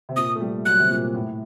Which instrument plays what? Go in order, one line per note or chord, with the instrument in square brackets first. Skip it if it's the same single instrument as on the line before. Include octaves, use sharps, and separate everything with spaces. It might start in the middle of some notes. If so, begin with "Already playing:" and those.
[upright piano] C3
[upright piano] A#2 [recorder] D#6
[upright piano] A3
G3
[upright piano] F#3 [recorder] F#6
[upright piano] C3
A#2
A2